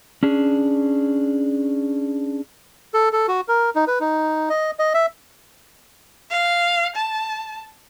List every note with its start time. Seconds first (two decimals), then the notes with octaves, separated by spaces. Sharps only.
0.23 C#4 D4 G#4
2.94 A4
3.13 A4
3.28 F#4
3.48 A#4
3.75 D#4
3.87 B4
4.00 D#4
4.50 D#5
4.79 D#5
4.94 E5
6.31 F5
6.96 A5